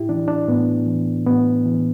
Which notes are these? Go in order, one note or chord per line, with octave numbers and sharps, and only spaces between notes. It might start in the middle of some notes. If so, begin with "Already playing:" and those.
Already playing: A2 E4 G4
E3 D4
D4
A2 B3
E3
A2 B3
E3